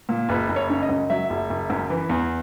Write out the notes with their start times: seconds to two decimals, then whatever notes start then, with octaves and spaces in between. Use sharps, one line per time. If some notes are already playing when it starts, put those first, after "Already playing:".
0.09 A#2
0.29 F#1 B4
0.49 F#1
0.56 C#5
0.70 C#3
0.83 D#5
0.89 F#2
1.10 F#3 E5
1.30 F#1
1.50 F#1
1.70 F#2
1.90 E3
2.09 E2